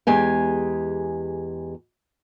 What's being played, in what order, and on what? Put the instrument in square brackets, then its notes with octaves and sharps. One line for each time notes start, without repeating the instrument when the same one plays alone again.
[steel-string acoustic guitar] E2 G#3 G4 G#5